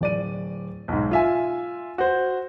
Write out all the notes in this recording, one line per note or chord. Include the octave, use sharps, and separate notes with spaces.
D1 D5 D#7
B1 G#2
F4 E5 G#5
F#4 C5